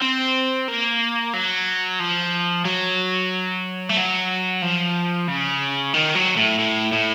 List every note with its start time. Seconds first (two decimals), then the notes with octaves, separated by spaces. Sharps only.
0.02 C4
0.68 A#3
1.34 F#3
2.00 F3
2.65 F#3
3.89 A3
3.97 F#3
4.62 F3
5.28 C#3
5.94 D#3
6.15 F#3
6.37 A2
6.59 A2
6.92 A2